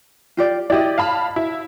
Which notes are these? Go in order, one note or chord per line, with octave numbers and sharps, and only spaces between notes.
F4 G4 D5
E4 G4 D5 D#5
F5 A5 B5
E4